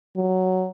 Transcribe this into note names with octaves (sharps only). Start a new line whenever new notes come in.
F#3